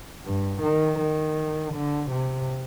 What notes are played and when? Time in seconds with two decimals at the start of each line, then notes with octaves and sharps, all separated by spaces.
0.25 G2
0.62 D#3
1.00 D#3
1.74 D3
2.11 C3